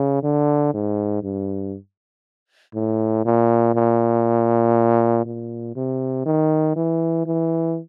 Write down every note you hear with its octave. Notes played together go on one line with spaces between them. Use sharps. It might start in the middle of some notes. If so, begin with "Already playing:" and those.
Already playing: C#3
D3
G#2
G2
A2
A#2
A#2
A#2
C3
D#3
E3
E3